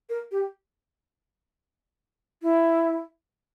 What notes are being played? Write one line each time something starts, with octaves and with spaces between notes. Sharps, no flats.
A#4
G4
E4